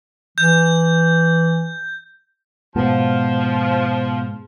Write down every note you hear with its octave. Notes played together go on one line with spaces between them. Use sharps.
E3 G6
G#2 B2 F3 B3 A5